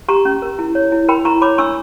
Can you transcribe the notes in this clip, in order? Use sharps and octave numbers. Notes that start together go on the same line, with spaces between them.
G4 A#5 C#6
C#4
A#4
E4
C#5
E4
A#4 G5 B5
E4 A#5 C#6
C#5 B5 D6
D4 C#6 E6